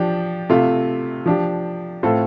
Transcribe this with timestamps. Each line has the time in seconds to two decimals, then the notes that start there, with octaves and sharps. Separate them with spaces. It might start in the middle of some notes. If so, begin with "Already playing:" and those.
Already playing: F3 D4 G4
0.49 C3 A3 F4
1.26 F3 D4 G4
2.03 A2 A3 C4 F4 A4